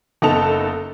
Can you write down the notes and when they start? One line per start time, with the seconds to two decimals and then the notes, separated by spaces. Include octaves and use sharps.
0.22 F#1 B3 D#4 A4 A5 F7